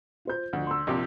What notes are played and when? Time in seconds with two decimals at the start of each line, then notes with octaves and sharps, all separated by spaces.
0.25 F4 C5 G6
0.53 D2 F3
0.67 C6 E6
0.87 A#1 C3 G4